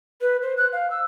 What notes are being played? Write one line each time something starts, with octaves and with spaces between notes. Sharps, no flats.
B4
C5
F#6
F5
E6